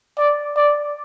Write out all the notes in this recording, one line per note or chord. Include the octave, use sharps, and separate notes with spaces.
D5
D5